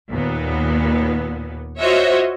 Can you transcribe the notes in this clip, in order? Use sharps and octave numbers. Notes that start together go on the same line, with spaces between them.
D#2 A#2 B3
F4 F#4 C5 C#5 D#5 E5